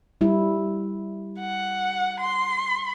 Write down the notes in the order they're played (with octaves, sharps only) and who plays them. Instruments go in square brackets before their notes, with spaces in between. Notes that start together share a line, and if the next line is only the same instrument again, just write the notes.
[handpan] G3 E4
[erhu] F#5
C6